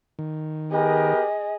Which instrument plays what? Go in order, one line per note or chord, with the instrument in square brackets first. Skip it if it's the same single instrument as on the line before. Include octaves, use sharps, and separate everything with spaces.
[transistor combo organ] D#3
[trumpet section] B3 G4 A#4 [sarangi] G#4 [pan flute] D#5